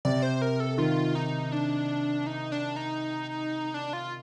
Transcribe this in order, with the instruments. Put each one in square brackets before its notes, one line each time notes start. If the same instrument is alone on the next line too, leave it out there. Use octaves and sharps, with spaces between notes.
[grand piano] C3 [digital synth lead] D5
[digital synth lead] C5
A#4
A4
[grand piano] D#3 [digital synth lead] F4
[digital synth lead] D#4
D4
D#4
D4
D#4
D4
F4